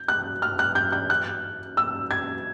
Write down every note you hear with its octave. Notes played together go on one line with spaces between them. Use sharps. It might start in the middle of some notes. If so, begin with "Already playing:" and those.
Already playing: G6
F#6
F6
F#6
G6
G6
F#6
E6
G#6